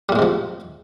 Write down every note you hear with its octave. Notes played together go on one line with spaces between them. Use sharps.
A2 C3 F3 G3 G#3